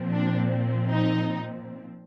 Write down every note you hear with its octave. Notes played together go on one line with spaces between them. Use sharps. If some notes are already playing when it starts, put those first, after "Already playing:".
Already playing: A#2 F3 C4
D4
D#4